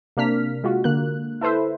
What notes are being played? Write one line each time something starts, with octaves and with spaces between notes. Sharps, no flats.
C3 A#3 D4 F6 B6
G#3 F4 F#4
D3 A#3 F#6
E4 A4 B4 C5 E5